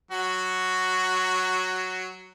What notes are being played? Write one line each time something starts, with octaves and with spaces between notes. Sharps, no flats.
F#3 F#4